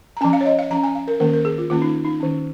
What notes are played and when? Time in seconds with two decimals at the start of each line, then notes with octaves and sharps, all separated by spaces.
0.17 A#5
0.21 C#4 G#5
0.24 F3
0.33 F5
0.41 C#5
0.46 D#5
0.59 F5
0.71 F3 C#4 A#5
0.84 G#5
0.95 F5
1.08 A#4
1.20 D#3 A#3 C#4 A#4
1.33 A#4
1.45 G#4
1.58 F4
1.70 D#3 A#3 C#4 F4
1.82 D#4
2.04 D#4
2.20 D#3 C#4